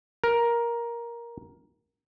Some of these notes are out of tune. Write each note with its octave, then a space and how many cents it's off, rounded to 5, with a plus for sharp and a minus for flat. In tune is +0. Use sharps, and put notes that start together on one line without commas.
A#4 +10